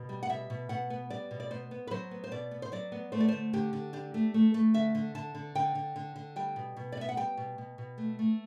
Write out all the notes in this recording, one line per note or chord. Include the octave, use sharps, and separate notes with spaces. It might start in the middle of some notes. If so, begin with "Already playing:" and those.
Already playing: B2
G3
F#5
B2 E5
B2
B2 F#5
B3
G3 D5
B2
D5
B3 C5
B3
B4
F#3 C5
B3
C5
B2 D5
B3
C5
F#3 D5
B3
A3 C5
D5
D3 C5
D3 G4
D3
D4 G4
A3
A3
A3
D3 E5
D3
D3 A5
D3
D3 G5
D3
D3
D3
G3 G5
B2
B2
D5
B3 E5
F#5
G3 G5
B2
B2
B2
A3
A3